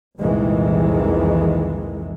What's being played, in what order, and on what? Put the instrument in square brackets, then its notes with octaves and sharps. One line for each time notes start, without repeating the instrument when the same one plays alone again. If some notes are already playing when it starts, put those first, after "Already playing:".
[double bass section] C2 F2 A#2 D#3 E3 G#3